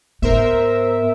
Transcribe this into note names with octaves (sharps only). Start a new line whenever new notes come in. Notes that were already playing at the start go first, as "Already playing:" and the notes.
G#2 B3 A#4 C5 E5